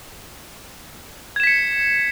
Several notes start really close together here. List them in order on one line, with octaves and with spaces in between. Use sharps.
G#6 E7 B6 C#7